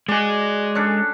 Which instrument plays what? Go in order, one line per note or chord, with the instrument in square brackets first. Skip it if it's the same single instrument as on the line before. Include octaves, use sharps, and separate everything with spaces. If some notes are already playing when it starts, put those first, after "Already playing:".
[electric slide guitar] G#3 G#4 [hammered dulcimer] F#4 D5
[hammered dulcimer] C#4 D4 A4